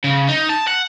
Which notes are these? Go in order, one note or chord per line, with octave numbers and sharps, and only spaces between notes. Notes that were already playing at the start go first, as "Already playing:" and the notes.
C#3
D#4
A5
F#5